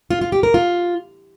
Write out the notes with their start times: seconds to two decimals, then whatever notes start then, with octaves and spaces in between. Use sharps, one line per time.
0.10 F4
0.21 F4
0.32 G4
0.43 A#4
0.54 F4